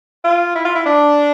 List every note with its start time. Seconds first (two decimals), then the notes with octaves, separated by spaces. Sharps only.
0.24 F4
0.55 E4
0.65 F4
0.75 E4
0.86 D4